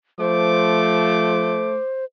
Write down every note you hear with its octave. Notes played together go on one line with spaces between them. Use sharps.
F3 A3 C5 D6